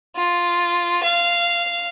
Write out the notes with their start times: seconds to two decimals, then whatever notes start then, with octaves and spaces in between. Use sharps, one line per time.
0.16 F4
1.03 F5